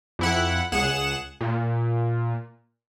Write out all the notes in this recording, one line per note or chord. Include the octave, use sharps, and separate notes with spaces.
F2 E4 F#5
C#2 G#4 F#5 E7
A#2